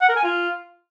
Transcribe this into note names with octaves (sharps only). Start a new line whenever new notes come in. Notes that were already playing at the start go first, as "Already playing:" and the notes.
F#5
A#4
G#5
F4